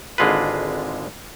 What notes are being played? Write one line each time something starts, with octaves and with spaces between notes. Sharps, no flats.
G#1 D3 G#3 F4 B4